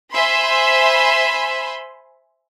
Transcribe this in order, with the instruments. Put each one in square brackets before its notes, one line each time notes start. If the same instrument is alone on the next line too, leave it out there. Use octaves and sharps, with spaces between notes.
[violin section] C5 E5 G#5 B5 C6